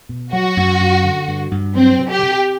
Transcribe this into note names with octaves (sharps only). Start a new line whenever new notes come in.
B2
F#3 F#4
F#2
F#2
D3
G2
G2
F#3 C4
C3
G4
C3